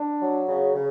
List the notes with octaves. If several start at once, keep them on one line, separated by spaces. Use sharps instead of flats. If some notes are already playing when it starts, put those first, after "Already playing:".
Already playing: D4
F#3
C#3
C#3